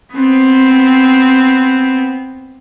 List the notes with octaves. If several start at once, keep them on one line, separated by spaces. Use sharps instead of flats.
B3 C4